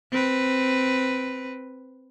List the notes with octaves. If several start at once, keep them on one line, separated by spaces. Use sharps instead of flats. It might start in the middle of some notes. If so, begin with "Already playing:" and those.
C4 B4